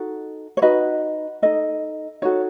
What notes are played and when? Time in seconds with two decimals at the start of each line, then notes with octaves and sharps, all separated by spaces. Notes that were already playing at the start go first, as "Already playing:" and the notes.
Already playing: D#4 F#4 A4
0.57 C#5
0.62 D#4 F#4 B4 D#5
1.42 D#4 A4 D#5
2.22 D#4 F#4 A4 C#5